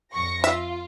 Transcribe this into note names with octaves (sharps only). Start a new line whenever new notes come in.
F2 C#6 A#6
F4 E5